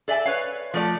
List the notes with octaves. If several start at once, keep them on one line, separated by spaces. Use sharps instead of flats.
A4 D5 E5 G#5
B4 C#5 F5
F3 A3 D5